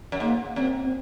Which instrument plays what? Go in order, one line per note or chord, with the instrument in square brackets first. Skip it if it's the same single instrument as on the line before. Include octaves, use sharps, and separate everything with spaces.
[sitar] F#2
[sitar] G#2 [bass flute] A#3
[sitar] F#2 [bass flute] C4
[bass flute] C4